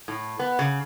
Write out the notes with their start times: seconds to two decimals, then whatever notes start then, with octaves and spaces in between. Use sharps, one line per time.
0.08 A2
0.39 B3
0.59 C#3